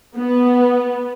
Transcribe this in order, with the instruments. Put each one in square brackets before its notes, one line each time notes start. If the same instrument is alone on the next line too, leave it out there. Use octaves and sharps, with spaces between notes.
[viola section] B3